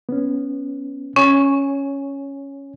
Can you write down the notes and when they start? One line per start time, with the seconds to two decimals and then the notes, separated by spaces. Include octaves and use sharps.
0.09 B3 C#4
1.16 C#4 C#5 G#5